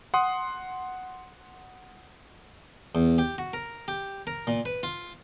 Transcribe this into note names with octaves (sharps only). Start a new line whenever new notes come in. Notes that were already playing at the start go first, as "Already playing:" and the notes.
F#5 C6 D#6
E2
G4
F#4
A#4
G4
A#4
A#2
B4
F4